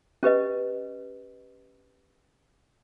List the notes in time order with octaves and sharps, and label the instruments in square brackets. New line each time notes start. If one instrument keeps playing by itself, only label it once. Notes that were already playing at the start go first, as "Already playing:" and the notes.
[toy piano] C#4 G4 B4 D#5